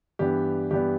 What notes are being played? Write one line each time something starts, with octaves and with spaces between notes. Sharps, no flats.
G2 E3 B3 D4 G4
G2 E3 B3 D4 G4